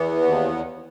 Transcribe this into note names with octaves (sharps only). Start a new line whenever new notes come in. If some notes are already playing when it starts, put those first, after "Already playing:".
Already playing: E2 E3 B3
D#2